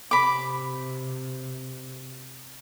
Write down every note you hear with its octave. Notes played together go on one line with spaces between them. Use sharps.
C3 B5 D6